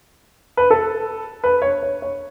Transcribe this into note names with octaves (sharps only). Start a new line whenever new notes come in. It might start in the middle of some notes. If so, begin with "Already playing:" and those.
B4
A4
B4
C#5
C#5
C#5